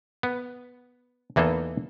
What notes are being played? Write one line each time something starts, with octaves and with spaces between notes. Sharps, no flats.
B3
E2 E3 A#3 D#4 A4